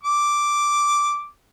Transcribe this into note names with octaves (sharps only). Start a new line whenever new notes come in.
D6